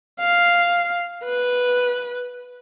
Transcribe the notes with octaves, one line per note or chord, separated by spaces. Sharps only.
F5
B4